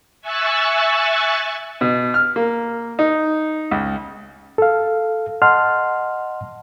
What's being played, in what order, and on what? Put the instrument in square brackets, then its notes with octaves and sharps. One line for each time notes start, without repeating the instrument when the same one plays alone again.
[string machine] E5 G#5 C#6 E6 F#6 A6
[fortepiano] B2
F6
A#3
D#4
C#2
[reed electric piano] A4 F5
D#5 F#5 A5 C6 F6